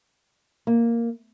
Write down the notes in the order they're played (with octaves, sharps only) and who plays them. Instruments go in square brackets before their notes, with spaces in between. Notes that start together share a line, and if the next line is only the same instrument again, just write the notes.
[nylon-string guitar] A#3